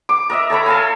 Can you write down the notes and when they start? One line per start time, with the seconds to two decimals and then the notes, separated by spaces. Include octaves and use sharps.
0.09 D6
0.30 A#4 D#5 E5
0.50 A4 C#5 A#5 B5
0.66 A4 F5 G#5